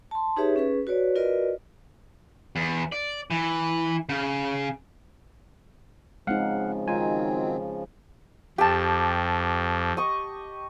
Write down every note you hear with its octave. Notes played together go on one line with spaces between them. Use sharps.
A5 C6
D#4 G4 G#4 B4 C#5 E5
C#4 G#4 B4
F#4 B4 C#5 D5
F4 F#4 A#4 B4 D5 D#5
E2
D5
E3
C#3
C#3 F3 G#3 C4 D#4 F5 F#5
D#3 F#3 G#3 C4 D#4 F4 G#5
F2 G4 A5
D#5 C#6